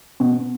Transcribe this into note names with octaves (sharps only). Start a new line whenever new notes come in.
B2